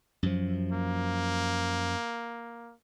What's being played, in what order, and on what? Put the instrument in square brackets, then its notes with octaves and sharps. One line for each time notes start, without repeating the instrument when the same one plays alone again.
[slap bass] F#2 F3
[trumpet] A#3